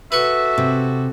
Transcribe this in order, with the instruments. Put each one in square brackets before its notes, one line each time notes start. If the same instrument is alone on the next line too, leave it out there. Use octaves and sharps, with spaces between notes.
[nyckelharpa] F#4 A4 [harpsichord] B4 C#6 [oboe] E5
[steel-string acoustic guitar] C3